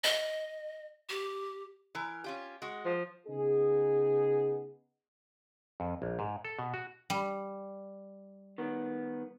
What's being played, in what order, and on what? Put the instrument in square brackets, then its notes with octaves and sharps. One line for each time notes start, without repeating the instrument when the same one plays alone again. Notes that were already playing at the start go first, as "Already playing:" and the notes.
[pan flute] D#5
G4
[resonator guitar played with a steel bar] E3 A#4
C#4 F4 G4
G#3 F#4
[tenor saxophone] F3
[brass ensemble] C#3 B3 D#4 G#4
[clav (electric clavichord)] F2
A#1
G#2
A4
B2
F#4
[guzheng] G3
[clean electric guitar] D#3 B3